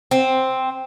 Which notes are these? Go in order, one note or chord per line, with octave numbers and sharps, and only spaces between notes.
C4